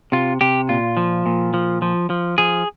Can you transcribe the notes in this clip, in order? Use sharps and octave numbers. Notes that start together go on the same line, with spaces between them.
C3 F4
C3 G4
A#2 F4
F3
A#2
F3
F3
F3
F3 G#4